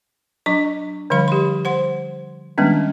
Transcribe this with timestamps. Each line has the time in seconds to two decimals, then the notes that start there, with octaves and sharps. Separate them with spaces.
0.46 F#3 D4 D#5 C#6
1.10 D3 F3 G3 F5 B5
1.28 G4 C6
1.65 C5 F#5 C6
2.58 D#3 G3 G#3 B3 C#4 D4